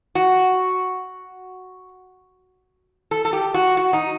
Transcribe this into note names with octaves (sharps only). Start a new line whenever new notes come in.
F#4
A4
A4
G4
F#4
F#4
D#4